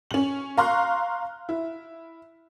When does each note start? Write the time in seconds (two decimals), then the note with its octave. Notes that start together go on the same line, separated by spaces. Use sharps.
0.11 C#4 F#7
0.58 F5 A#5 C6 C#6 F6 F#6
1.49 E4